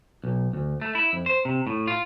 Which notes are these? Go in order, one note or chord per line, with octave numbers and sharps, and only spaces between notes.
B1
D2
A3
E4
F2
C5
C3
A2
F4